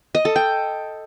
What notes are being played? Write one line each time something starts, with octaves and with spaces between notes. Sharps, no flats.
D#5
A4
G5